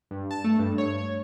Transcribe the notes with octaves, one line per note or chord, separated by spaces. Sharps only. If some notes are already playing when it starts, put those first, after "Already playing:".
G2
A5
A3
G2
C#5
C#5